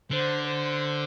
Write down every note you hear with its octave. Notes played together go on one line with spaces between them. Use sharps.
D3 C5
C5